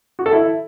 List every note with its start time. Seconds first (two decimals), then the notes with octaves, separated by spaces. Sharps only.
0.19 F#4
0.26 A4
0.33 E4